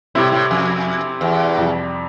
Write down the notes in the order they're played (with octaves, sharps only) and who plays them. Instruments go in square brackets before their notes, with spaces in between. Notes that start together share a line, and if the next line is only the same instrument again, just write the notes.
[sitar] A2 [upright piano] C3 G3 C4 E4
[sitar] A2
F2
E2
[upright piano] F2 C3 G3